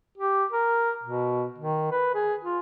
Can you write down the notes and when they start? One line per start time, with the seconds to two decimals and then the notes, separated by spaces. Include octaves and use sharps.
0.17 G4
0.52 A#4
1.03 B2
1.58 D#3
1.91 B4
2.14 G#4
2.44 F4